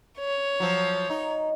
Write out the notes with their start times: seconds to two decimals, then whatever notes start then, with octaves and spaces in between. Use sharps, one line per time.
0.19 C#5
0.60 F3 F#3
1.10 D#4